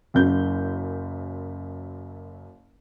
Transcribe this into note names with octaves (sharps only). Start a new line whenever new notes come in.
F#1 F#2 G6